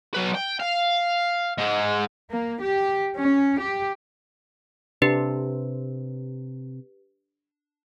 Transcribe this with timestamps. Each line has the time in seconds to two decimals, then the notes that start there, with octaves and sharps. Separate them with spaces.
0.15 F#3 B4
0.35 G5
0.60 F5
1.58 G#2 G#3
2.31 A#3
2.62 G4
3.16 C#4
3.59 G4
5.02 C3 D4 G4 B4